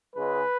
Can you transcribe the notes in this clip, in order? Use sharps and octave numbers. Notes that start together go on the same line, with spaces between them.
C#2 C#3 G#3 B4